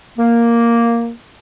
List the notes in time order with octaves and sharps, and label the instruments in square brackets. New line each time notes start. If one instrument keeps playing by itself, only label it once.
[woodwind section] A#3